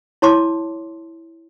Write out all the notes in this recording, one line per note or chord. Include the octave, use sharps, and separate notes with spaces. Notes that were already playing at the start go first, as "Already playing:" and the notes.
E4 C#5 A5 C6 D6